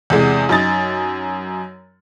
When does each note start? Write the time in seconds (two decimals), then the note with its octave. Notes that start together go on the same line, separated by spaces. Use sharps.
0.10 E2 C3 G#3
0.49 F#2 D#4 A6